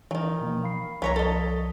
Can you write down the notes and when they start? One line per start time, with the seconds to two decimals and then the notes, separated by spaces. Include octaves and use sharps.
0.11 D#3 E3 F#3
0.41 B2 F3 A#3
0.64 F5 B5 C7
1.02 C2 F3 F#3 C#5 A#5 B6
1.16 A4 D#5